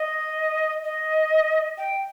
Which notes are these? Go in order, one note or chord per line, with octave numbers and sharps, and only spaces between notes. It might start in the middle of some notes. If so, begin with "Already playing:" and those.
Already playing: D#5
D#5
G5